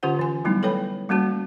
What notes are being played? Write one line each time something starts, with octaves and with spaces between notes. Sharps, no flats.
D3 C#4 F4 G4 C5 F#5
E3 G#5
F#3 G3 A3 B3 D#4 E4
A4 B4 C#5 G5 B5
G3 A3 A#3 C#4 F#4 A5